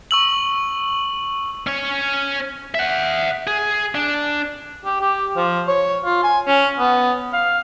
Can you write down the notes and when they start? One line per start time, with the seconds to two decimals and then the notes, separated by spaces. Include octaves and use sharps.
0.11 C#6 E6 F#7
1.67 C#4 C#5
2.75 E5 F#5
3.47 G#4
3.95 D4
4.86 G4
5.01 G4
5.37 F3
5.67 C#5
6.05 F4
6.23 G#5
6.48 C#4
6.79 B3
7.33 F5